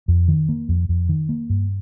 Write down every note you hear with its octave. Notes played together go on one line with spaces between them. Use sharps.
F2
D#3
A#3
F2
F2
D#3
A#3
G2